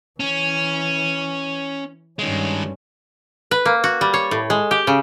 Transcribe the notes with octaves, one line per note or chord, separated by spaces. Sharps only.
E3 C#4
G2 D#3 G#3 C#4
B4
A#3
F#4
G3
C#5
A2
G#3
G4
C#3